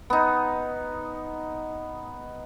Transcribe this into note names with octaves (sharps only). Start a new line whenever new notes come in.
B3 D#4